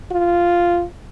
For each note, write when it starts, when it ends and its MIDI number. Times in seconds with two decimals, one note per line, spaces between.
0.11 0.84 65